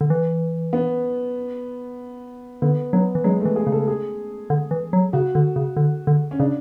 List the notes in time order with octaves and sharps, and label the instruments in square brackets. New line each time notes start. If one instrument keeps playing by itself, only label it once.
[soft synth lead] D3
E3
[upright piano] B3
[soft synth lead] D3 [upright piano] B3
[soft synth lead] F#3 [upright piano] B3
[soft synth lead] E3
[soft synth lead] F#3 [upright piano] G#3
[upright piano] A3
[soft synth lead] E3
[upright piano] G#4
[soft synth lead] C#3
[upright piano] A4
G#4
[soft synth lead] D3
E3
F#3
[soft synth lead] C#3 [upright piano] F#4
[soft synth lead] D3
C#3
D3
D3
[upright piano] C#4
[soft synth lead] C#3 [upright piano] D4